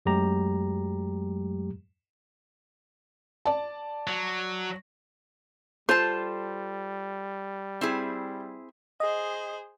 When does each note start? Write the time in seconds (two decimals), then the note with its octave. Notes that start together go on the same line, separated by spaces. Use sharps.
0.06 F#2 F#3 G#3 A3 G4 A#5
3.45 D5 A5
4.08 F#3
5.89 G3 F4 A4 C5 A5
7.81 C4 E4 G#4
9.00 G#4 C5 D#5